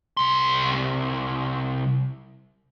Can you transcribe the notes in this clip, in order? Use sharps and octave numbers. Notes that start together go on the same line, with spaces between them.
C2 C6